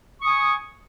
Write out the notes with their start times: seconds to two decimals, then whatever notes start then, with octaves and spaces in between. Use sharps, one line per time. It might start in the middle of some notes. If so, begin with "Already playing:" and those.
0.21 C#6
0.23 D#6
0.26 G#5